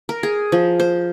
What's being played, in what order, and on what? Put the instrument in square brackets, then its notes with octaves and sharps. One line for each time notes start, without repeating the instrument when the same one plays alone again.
[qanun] A#4
G#4
F3
C5